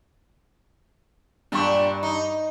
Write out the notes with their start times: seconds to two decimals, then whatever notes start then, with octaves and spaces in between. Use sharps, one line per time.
1.52 G2 A#2 D4 G4 C#6
2.03 D#4